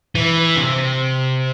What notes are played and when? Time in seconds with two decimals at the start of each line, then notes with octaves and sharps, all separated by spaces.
0.15 E3
0.56 C3